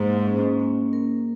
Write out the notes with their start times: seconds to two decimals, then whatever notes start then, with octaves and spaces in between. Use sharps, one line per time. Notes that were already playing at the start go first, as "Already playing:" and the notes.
Already playing: G#2 A#3
0.25 C#4
0.60 A#3
0.93 A#4